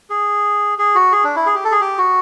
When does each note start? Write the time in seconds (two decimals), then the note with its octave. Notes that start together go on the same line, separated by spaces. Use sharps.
0.10 G#4
0.78 G#4
0.95 F#4
1.12 G#4
1.24 D4
1.36 E4
1.46 G#4
1.55 G4
1.64 A4
1.72 G#4
1.81 G4
1.98 F#4